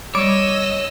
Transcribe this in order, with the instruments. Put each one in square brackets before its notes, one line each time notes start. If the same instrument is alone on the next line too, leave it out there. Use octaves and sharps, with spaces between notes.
[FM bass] G3 [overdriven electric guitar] C#5 [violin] D#5 E6 [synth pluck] D6